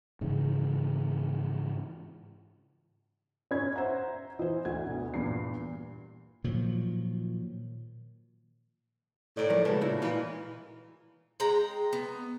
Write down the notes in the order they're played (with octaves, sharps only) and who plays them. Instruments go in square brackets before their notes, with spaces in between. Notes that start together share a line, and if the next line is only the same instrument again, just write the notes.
[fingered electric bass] G#2 C#3 E3
[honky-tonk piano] C#4 G#6
[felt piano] C5 E5 F#5 [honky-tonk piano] A#5
[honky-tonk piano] E3 [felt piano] C5 D#5
[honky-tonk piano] D2 [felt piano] G#6
[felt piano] B2
[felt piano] E2 G2 A#2 [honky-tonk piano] C7
[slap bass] A#2 D#3 F3 F#3
[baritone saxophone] A2 [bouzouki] D#3 D5
[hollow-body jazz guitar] F3 A#4
[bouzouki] C#3 F#4 [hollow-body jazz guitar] G#3 B4 A5
[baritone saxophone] A#2 [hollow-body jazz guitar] D#4 E4
[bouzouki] A#2 F4 [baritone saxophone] E3
[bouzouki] G#3 G5 A#5
B3